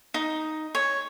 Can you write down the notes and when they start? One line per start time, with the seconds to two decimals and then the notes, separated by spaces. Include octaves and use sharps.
0.14 D#4
0.75 C#5